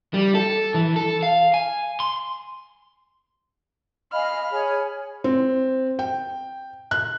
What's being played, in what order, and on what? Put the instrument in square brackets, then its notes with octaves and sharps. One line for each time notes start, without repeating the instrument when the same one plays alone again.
[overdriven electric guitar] G3
A4
E3
A4
F5
G#5
C6
[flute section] D#5 F5 G#5 [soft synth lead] B5 [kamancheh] F6
[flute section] G#4 G#5 [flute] C#5
[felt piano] C4
G5
F#6